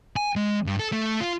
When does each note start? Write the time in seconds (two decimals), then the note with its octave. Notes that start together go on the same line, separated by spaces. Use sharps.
0.16 G#5
0.36 G#3
0.66 G2
0.79 A4
0.92 A3
1.21 F4